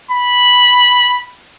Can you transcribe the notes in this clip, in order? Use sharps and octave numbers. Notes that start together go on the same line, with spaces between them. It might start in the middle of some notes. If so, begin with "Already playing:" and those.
B5